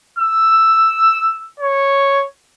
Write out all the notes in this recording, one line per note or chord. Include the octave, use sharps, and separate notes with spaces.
E6
C#5